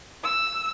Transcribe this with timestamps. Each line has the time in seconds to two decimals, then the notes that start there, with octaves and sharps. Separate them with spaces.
0.24 E6